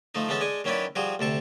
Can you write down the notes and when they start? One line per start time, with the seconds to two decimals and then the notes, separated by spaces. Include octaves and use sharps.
0.15 F3 A3 D#4
0.28 E3 G#3 B3 C#4 A4
0.41 G#3 D4 G#5
0.64 D#3 F#3 C#4 E4 B4 D5
0.96 F3 G3 F#4 G#4
1.19 D2 C3 A4 C#6